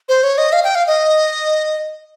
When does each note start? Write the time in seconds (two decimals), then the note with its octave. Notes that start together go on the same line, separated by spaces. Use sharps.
0.09 C5
0.23 C#5
0.38 D#5
0.53 F5
0.64 G5
0.75 F5
0.87 D#5